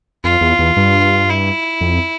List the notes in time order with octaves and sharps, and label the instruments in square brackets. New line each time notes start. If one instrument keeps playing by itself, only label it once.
[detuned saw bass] F2 [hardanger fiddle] F4
[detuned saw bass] E2
E2
G2
[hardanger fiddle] E4
[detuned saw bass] F2